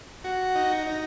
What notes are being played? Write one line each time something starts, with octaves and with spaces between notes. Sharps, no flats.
F#4
D#4
D#4